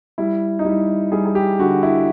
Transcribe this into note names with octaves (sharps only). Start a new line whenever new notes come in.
G3 E4
D#4
G3 E4
G3 G#4
G#4
G4
D3 F#4
E4